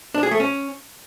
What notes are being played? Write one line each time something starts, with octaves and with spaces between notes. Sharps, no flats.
D4
G#4
A3
C#4